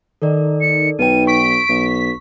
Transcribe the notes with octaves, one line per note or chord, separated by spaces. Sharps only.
D#3 A4 A#4 D5
C#7
B1 D#4 B4 G5 D#7
C#6 B6 D7
B1